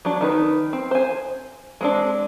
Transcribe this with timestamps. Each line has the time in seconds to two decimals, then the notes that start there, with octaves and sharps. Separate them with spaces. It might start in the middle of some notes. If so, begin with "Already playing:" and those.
0.05 F#3 D4
0.21 D#3 D#4 B4
0.73 C4
0.91 C5 G#5
1.81 G#3 C4 D4